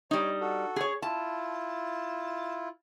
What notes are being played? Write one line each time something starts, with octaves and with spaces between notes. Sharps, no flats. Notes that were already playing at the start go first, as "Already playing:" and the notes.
G3 D#4 C#5 A#5
F#4 A4
G#4 C#5
E4 F4 A5